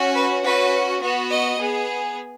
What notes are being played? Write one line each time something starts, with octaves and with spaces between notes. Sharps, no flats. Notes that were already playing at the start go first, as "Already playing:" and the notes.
Already playing: C#4 F#4
B4
C#4 F#4 B4
B3 F#4
D#5
B3 G#4